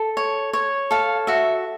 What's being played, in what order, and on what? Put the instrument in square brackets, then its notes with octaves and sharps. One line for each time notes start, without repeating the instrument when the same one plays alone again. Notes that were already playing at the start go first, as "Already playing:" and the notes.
Already playing: [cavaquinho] A4
C#5
C#5
A4 F5
F#4 E5